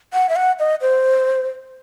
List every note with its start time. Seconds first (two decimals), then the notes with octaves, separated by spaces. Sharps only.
0.13 F#5
0.29 E5
0.36 F#5
0.59 D#5
0.81 C5